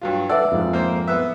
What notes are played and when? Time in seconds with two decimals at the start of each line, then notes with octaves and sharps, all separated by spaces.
0.01 G2 F#3 F4
0.29 A4 B4 D5 E5 F#5 A5 E6
0.52 F2 G#2
0.73 A#3 C5
1.08 B3 E5 E6 F#6